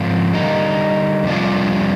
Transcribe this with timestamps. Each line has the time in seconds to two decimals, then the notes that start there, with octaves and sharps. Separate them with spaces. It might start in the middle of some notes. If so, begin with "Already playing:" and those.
Already playing: G#2 F3 C4 F4
0.32 D3 G3 A#3 D#4
1.24 F2 C3 G3 D4 F4